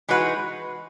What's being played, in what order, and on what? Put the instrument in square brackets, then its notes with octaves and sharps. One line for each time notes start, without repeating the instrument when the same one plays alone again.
[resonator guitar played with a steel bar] E3 G#3 D#4 F#4 B4